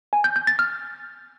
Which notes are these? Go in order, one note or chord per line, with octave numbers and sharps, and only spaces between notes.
G#5
G6
G6
A6
F6